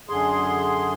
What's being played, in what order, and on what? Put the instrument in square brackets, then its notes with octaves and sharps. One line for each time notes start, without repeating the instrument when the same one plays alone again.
[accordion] F#2 D3 G#4 C6